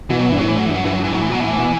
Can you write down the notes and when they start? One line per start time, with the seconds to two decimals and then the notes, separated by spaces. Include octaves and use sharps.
0.10 B2 E3
0.19 F#3
0.29 G2 E3
0.38 A2 F#3
0.48 E3
0.57 F#3
0.66 G2 E3
0.75 F#3
0.84 G2 E3
0.93 F#3
0.99 G2
1.04 E3
1.12 A2 F#3
1.21 E3
1.29 B2 F#3
1.40 A2 E3
1.58 B2